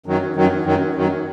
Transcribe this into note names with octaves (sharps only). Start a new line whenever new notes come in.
F#2 D#3 F#3
F#2 D#3 F#3
F#2 D#3 F#3
F#2 D#3 F#3